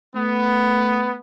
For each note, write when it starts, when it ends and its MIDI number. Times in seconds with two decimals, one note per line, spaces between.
0.15 1.17 57
0.15 1.18 59